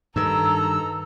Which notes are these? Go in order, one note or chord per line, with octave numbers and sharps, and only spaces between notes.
G2 D#3 A4 A#5 E6